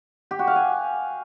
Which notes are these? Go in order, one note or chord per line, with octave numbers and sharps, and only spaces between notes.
G4
F#4
F5
G#5